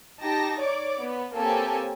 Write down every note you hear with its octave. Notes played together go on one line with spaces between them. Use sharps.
D#4 G4 A5 A#6
C#5 D5 D6
B3
A#3 C4 G4 A4 C#5 G#5